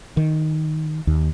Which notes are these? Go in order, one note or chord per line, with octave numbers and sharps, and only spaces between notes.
D#3
D#2